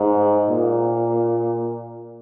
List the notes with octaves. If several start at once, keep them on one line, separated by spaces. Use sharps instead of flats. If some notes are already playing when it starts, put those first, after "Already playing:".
Already playing: G#2
A#2